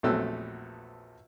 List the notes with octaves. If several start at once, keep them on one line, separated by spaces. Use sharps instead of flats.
A#1 E2 F#3 A3 C4 E6